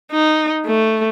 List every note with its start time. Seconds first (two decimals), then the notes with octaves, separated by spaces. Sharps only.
0.11 D#4
0.66 A3